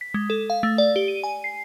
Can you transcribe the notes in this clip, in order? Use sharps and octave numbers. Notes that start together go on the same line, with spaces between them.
B6
G#3
A4
F5
A3
D5
G4
D#7
G#5
C7